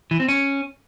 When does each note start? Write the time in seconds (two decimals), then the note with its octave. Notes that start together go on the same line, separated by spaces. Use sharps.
0.11 E3
0.20 C4
0.29 C#4